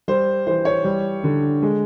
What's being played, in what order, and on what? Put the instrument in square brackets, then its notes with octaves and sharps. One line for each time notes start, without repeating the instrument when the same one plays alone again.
[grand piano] G3 C5
E3 C5
C#5
G3
D3
G#3